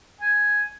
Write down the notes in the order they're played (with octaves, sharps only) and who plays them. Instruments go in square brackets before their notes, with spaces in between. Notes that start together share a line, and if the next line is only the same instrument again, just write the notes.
[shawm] G#5